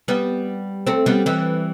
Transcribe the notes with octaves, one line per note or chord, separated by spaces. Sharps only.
G3 B3
A3 C4
G3 B3
E3 G3